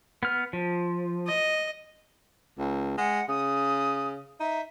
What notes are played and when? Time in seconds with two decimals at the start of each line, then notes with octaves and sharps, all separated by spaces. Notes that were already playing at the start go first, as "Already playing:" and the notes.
0.23 B3 F6
0.53 F3
1.27 D#5
2.59 C#2
2.98 G#3 F#5
3.29 C#3 D#6
4.40 D#4 E5